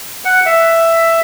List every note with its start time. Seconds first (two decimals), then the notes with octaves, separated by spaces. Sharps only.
0.25 F#5
0.46 E5